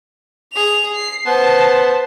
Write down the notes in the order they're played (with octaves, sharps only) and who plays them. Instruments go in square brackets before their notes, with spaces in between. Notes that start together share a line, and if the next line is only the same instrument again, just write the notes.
[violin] G#4 F7
C7
[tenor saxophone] B3 [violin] C5 A5